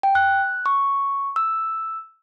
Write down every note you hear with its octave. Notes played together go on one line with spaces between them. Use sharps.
G5
F#6
C#6
E6